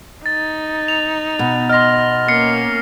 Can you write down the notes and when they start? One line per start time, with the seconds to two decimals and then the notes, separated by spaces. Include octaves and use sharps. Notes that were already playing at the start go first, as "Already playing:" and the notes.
0.26 D#4 A6
0.88 F7
1.39 B2
1.69 D#5 C6 F6 A#6
2.28 A#3 C#4 F6 C7 C#7